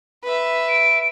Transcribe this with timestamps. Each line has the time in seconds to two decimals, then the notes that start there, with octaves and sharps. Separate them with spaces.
0.24 B4 E5
0.68 D7